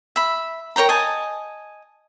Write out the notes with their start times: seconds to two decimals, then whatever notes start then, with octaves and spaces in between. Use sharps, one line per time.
0.16 E5 B5
0.76 A#4 C#5 G5 A#5
0.89 D#5 G#5 A5